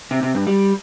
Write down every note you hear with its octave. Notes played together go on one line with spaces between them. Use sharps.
C3
C3
G2
G3